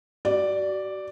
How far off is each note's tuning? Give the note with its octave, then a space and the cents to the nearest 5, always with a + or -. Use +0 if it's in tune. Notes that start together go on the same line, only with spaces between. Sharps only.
F#4 +40 D5 +0